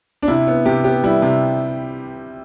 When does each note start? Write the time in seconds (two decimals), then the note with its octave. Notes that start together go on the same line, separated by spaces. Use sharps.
0.22 D4
0.28 C3 E4
0.47 B3
0.66 C3 G4
0.84 B3 G4
1.04 G3 E4
1.22 C3